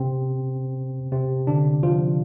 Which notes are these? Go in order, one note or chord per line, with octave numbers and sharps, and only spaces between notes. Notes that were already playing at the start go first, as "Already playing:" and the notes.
Already playing: C3 C4
C3 C4
D3 D4
F3 F4